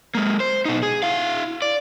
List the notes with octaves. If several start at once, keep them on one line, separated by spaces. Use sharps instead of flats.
G#3 A#3
C5
B2 D#4
G#4
E4 F5
D5